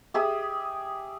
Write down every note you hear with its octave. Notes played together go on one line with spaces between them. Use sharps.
G4 G#4 E5 D#6